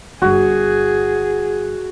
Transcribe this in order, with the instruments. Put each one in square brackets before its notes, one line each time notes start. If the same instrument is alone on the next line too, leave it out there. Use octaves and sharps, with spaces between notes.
[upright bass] G1 G2 [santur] F#4 [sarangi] G#4